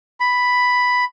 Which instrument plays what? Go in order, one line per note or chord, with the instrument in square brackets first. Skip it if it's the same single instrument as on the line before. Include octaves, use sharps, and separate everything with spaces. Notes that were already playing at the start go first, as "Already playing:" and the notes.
[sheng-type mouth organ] B5